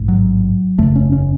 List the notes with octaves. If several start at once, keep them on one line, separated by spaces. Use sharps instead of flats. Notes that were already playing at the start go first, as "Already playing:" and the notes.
Already playing: A1 G#2
F#3
F#1 E2 C#3 A3
C#4
C#4